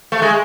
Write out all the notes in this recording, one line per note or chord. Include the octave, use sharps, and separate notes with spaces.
A3
G#3